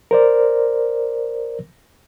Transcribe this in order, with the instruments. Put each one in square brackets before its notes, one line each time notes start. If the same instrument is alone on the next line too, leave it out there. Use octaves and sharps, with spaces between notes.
[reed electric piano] A#4 C5 D5